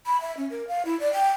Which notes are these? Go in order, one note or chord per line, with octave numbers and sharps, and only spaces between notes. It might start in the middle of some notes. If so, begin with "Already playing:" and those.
B5
E5
C#4
A#4
F5
E4
D5
G5